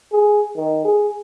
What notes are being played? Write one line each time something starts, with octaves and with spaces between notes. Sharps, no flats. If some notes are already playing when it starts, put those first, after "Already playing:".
G#4
D#3
G#4